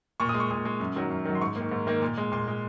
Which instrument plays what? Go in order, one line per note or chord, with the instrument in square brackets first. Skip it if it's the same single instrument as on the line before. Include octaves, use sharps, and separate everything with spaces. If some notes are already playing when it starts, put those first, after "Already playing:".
[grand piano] A#2 C#6
D#6
G#3
C#6
A#2 D#6
G#3
F#2
D#3 F#3
F#2
D#3 F#3
C6
G#2 C#6
A#3
D#3
G#2
D#3 A#3
A#2
G#3
A#2 C6
G#3